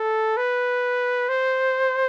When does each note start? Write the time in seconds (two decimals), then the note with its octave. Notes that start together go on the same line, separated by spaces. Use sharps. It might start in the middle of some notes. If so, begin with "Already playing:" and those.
Already playing: A4
0.37 B4
1.29 C5